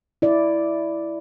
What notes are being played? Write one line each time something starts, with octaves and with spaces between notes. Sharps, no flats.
E4 D5